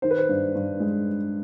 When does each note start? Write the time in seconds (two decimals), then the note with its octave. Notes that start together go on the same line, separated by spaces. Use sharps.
0.02 D#3 C5
0.11 B4
0.17 C5
0.29 G2
0.55 G2
0.80 G#3